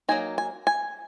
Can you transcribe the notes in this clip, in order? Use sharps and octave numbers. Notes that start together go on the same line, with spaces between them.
F#3 A#3 D#4 G#5
G#5
G#5